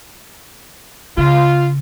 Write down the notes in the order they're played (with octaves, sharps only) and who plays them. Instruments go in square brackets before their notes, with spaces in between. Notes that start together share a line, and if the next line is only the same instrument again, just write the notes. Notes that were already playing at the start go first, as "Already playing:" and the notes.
[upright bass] C#3 [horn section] F4